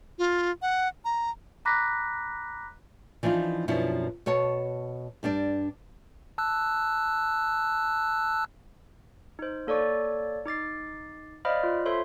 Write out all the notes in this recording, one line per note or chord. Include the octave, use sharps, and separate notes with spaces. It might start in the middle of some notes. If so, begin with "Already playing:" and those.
F4
F#5
A#5
A#5 B5 D6 F#6 A#6 B6
E3 F3 D4 D#4 F4
F#2 B2 F3 B3 D4 E4
B2 F#4 C#5 A5
G2 G3 D4 D5
A5 E6 F#6
D#4 C5
A#3 A4 C#5 D5 C#6
D#4 D6 A6 C7
C5 D5 D#5 F5 B5 F6
F4
A4 C5 C#5 E5 B5 C6